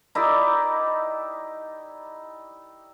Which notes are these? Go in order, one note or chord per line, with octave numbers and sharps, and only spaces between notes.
D#4 E4 G4 D5